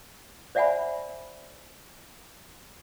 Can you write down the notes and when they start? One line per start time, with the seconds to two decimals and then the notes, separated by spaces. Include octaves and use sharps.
0.55 C5 D5 E5 F#5 G#5 B5